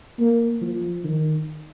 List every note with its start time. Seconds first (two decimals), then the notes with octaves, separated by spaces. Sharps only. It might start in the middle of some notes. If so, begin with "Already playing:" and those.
0.19 A#3
0.62 F3
1.04 D#3